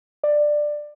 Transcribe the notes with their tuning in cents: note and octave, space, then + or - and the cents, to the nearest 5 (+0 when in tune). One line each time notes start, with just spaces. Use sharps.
D5 +15